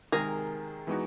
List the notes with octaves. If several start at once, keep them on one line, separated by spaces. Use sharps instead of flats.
C3 D#3 G#3 G#4 A#4
E3 G#3 B3 D#4 F#4